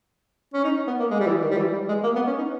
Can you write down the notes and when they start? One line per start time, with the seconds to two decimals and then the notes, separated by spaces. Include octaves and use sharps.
0.53 C#4
0.64 D#4
0.87 B3
0.99 A#3
1.11 G#3
1.20 G3
1.27 E3
1.41 D#3
1.50 G3
1.57 E3
1.72 G3
1.88 G#3
2.03 A#3
2.15 B3
2.27 C#4
2.38 D#4